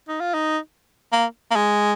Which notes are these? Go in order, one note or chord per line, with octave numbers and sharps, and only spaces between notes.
D#4
F4
D#4
A#3
A#3
G#3